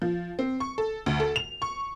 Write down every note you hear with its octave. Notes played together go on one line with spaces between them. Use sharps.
F3
C4
C#6
A4
D2
A4
F7
C#6